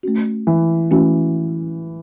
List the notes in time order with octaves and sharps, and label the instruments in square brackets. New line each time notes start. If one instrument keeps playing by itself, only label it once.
[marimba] A3 C#4 F#4
[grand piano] E3
[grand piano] E3 [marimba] A3 C#4 F#4